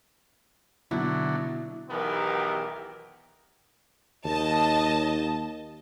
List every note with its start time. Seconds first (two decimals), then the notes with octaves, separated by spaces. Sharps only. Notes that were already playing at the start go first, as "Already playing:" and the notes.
0.91 B2 D3 F#3 E4
1.90 B1 D#3 E3 B3 G4 A#4
4.25 D#2 D#5 A5